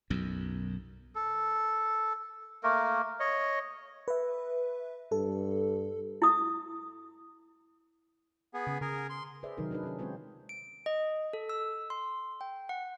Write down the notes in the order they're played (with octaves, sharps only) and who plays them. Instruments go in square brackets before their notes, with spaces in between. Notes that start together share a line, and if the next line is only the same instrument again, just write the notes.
[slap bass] B1 F#2
[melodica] A4
A3 A#3 A#4
C#5 D#5
[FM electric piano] B4 E5
[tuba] G2 [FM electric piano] A4
[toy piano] E4 D#6
[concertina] B3 G#4
[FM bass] C#3
[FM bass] C#3 [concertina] G#4 A#4
[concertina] C6
[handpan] G#4 B4 C5 D5 E5
C3 D#3 F#3 D#4 G4 A#4
D4 D#4 G#4 B4
C#4 G#4
G#3 C4 F4 C5 C#5
[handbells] D7
D#5
A4
E6
C6
G5
F#5